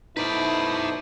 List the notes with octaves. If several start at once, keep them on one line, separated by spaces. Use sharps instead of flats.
B2 A3 D#4 E4 B4 C5 D5